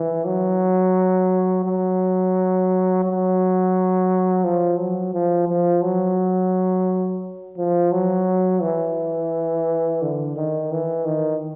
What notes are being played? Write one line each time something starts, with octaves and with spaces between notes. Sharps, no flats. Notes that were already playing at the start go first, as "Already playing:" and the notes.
Already playing: E3
F#3
F#3
F#3
F3
F#3
F3
F3
F#3
F3
F#3
E3
D3
D#3
E3
D#3